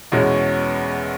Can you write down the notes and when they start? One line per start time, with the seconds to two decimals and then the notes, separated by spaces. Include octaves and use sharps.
0.12 E2 B2 G#3 C#4